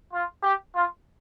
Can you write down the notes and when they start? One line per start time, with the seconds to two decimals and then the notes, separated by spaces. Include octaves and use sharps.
0.13 F4
0.43 G4
0.75 F4